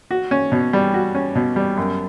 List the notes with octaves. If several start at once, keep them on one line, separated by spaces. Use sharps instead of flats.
F#4
C#4
B2
G3
F#4
C#4
B2
G3
F#2